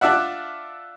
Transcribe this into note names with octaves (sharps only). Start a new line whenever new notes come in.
D4 F4 D5 E5 F#5